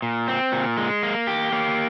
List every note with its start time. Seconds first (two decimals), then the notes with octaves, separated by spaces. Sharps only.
0.02 A#2
0.28 C4
0.52 A#2
0.77 G#3
1.03 A#3
1.27 G4
1.52 A#3